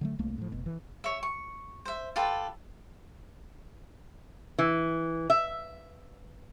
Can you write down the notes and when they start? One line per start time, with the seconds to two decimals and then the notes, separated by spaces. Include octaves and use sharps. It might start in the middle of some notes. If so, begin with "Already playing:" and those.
0.01 D3 F#3 A3
0.19 C2 A3 A#3
0.38 A2 F3
0.52 F1 B2
0.66 E3
1.04 C#5 E5
1.23 C#6
1.85 C5 E5
2.16 F4 G4 A4 B4
4.59 E3
5.30 E5